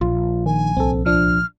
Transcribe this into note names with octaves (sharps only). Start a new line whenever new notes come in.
A#1 F4
D#3 G#5
C2 C4 A4
F3 D4 F6